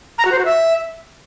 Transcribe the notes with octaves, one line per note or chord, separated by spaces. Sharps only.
A#5
F#4
C5
F#4
E5